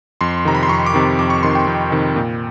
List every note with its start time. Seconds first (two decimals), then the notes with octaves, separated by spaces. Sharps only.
0.21 F2 C6
0.45 C3 D#3 A#5
0.55 B5
0.63 C6
0.69 F2 C#6
0.86 D6
0.94 C3 D#3
1.19 F2 D6
1.30 C#6
1.43 C3 D#3 C6
1.55 G5
1.67 F2
1.92 C3 D#3
2.16 A#2